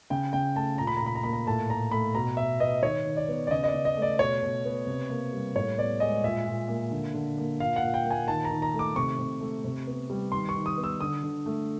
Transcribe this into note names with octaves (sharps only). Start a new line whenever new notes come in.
C#3 G5
C#3 G5
A3 A5
A#2 A#5
B5
A#5
A#2 B5
A#5
A#3 B5
A#5
A2 A5
A2 A#5
A3 B5
B2 A#5
B2 E5
B3 D#5
D#3 C#5
D#3
D5
B3
D5
C#3 D#5
D#5
D5
C#3
D#5
A3
D5
B2 C#5
B2
B3
C3
A#3
G3
A2 C#5
B3 D5
G#3 D#5
A#2 E5
A#2
A#3
D3
D3
A#3
A#2 F5
F#5
A#2
G5
A#3
G#5
D#3 A5
A#5
D#3
A#5
A3
D6
C3 C#6
C3
A3
C3
B3
G3
D#3 C6
C#6
D#3
D#6
B3
E6
D3 D#6
D3
A3